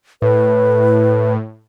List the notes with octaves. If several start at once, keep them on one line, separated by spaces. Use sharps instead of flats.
A2 B4